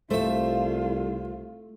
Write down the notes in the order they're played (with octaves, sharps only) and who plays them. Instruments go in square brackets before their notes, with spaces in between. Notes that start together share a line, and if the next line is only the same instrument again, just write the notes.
[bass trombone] C2 [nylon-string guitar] A3 [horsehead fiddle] F4 [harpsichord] C5 E5